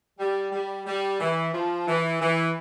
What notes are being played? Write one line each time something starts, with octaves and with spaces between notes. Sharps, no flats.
G3
G3
G3
E3
F3
E3
E3